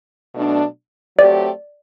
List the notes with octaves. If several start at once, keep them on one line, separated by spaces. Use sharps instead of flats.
B2 F#3 A3 D4
F#3 A3 C4 G4 D5